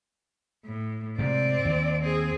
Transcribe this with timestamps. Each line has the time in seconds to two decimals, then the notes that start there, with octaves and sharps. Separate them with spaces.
0.65 A2
1.19 G#2 C3 C4 D5
1.65 D#2
2.01 C4 G#4